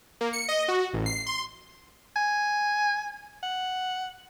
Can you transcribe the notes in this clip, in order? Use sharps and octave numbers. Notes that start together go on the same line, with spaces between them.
A#3
C#7
D#5
F#4
A1
C7
C6
G#5
F#5